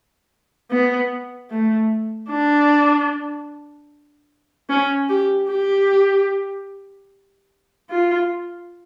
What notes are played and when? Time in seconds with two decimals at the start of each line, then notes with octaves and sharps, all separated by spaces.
0.71 B3
1.50 A3
2.30 D4
4.69 C#4
5.09 G4
5.49 G4
7.89 F4